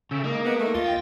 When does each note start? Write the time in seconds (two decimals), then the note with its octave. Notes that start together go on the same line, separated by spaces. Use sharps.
0.11 C#3 A4 E5 G5
0.24 G#3 A#3 D#4
0.46 B3
0.60 A3
0.74 D#2 F4 D#5 A6
0.86 G5